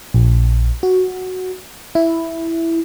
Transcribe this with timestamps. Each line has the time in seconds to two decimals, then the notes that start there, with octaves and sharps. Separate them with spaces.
0.14 A#1
0.83 F#4
1.95 E4